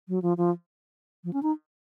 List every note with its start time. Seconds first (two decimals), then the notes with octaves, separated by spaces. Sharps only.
0.08 F#3
0.22 F3
0.37 F3
1.24 F3
1.33 C#4
1.43 D#4